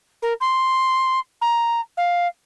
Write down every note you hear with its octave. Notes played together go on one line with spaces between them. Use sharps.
A#4
C6
A#5
F5